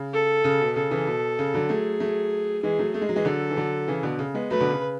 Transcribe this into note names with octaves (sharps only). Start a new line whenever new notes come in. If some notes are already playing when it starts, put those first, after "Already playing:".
Already playing: C#3
A4
C#3
B2
C#3 A4
C#3 E3
B2
C#3
D3 F#3
F#3 A3 G#4
F#3 A3
E3 G#3 G#4
F#3 A3
A3 G#4
G#3
F#3
E3 G#3
D3 F#3 A4
E3
D3 F#3
C#3 E3
B2 D3
C#3
G#3 B3
F#3 A3 B4
B2 D3
C#3